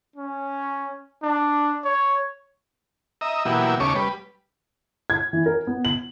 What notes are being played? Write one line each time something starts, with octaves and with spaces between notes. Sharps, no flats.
C#4
D4
C#5
D#5 E5 A#5
B2 E3 F#3 A#3 E4 G4
D#2 C#3 A3 C#4 C#6 D6
G3 B4
G#6
E3
A#4
B3
F#7